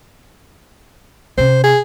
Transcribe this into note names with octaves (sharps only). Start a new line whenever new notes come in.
C3 C#4 C5
G#4